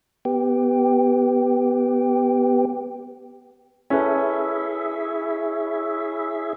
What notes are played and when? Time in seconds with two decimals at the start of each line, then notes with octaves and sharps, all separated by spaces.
0.25 B3 G4
3.90 C#4 E4 G#4 A4 B4 E5